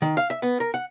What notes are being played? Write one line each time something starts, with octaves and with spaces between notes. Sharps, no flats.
D#3
F5
E5
B3
A#4
F#5